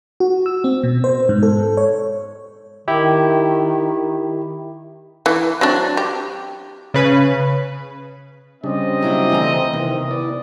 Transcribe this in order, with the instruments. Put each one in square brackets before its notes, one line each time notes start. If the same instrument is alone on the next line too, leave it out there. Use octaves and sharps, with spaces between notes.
[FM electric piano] F#4
E6
C4
B2
C5
G#2
A4
C#5
[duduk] D#3 [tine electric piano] E4 G4
[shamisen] E3
F#3 C4 D4
G4
[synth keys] C#3 B4
[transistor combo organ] C#3 G3 D4 [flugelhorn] C4 [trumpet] D#5
[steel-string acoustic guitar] D#2 F#3 E4
D2 E3 A#5
[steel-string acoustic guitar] C3 [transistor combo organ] D#3 E3 B3
[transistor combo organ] B3 E4 D5